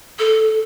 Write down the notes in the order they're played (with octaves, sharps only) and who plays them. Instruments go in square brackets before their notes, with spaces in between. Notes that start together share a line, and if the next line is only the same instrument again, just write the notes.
[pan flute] A4